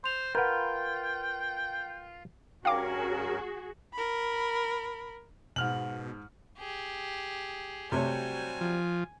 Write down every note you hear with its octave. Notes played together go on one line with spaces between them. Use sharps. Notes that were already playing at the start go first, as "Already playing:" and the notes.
C5 C6 F7
F4 A#4 B4 F#5 G5 G6
G2 C#4 F#4 G#4 A#4 F5 G5 D6
A#4 B5
G#2 B2 F6 F#7
G4 G#4
C3 F#3 G3 A3 C4 C#5 G#5
F3